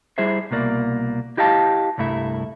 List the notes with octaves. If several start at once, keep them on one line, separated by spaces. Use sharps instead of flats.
G3 E4 G#4 C5 E5
C2 B2 A#3 D5
E4 G4 D#5 F5 A5
C2 G2 A3 E4 E5